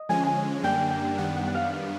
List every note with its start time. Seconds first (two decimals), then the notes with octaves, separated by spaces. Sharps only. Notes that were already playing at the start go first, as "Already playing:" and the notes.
Already playing: D#5
0.09 D3 F3 G#3 C#4 G#5
0.27 G#5
0.63 F#2 D3 G3 A#3 D4 G5
0.90 G5
1.18 F#2 D#3 G3 B3 D4 F#5
1.37 F#5
1.48 F#5
1.55 F5
1.73 F5